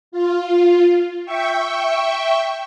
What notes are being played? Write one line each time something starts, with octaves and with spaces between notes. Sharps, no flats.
F4
E5 G5 C#6